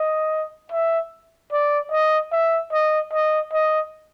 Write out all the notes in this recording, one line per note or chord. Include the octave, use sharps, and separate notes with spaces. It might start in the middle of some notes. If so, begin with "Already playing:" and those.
Already playing: D#5
E5
D5
D#5
E5
D#5
D#5
D#5